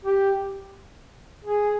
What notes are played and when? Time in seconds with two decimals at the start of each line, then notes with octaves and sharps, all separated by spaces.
0.05 G4
1.45 G#4